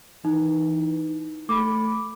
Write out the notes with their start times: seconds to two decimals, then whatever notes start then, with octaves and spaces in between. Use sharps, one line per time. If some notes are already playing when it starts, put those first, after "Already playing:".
0.25 E3 D#4
1.49 A3 B5 D6